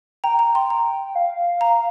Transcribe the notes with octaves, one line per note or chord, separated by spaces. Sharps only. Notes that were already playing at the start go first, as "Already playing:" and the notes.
G5 A#5
A#5
C6
A#5
F5
A#5